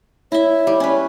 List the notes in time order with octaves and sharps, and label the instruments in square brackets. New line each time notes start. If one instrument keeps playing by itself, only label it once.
[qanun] E4 E5 [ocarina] C#5
[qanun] G3
C#4 B4